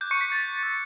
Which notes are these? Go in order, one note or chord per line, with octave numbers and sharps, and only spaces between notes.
D6 F#6 G6
C#6 C#7
B6
A6
C#6 E6 G6